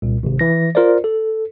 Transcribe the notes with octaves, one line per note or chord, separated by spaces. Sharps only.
C2 A#2
G#1 C3
E3 A#6
F4 A#4 C5 D5
A4